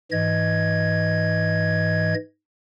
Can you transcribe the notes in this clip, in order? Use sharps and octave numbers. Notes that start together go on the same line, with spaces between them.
G#2 E3 D#5 G#6